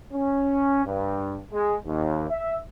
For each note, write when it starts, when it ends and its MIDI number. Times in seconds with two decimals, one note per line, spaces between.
0.12 0.85 61
0.85 1.38 43
1.52 1.76 56
1.86 2.29 39
2.30 2.57 76